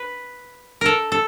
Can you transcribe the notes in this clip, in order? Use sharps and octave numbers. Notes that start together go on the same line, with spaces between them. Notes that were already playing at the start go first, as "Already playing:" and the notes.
Already playing: B4
A4 A#4
A4